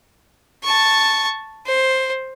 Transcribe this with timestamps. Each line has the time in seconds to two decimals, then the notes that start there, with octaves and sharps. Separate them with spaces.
0.64 A5 C#6
1.67 C5